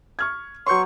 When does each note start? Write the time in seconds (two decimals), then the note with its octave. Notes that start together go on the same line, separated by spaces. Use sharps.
0.19 C#6 F6 G#6
0.66 F#3 B3 C#5 C6 C#6 G6